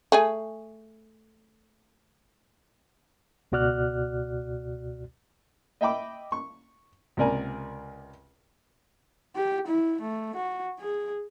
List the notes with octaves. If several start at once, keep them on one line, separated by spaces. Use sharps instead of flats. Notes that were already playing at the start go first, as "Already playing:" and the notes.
A3 G#4 G#5
C#2 B2 F#4 D5 F6 F#6
D#5 E5 G5 B5 D6
C#6
C#2 C3 A#4 D5 G#5 A#5
G4
E4
A3
F#4
G#4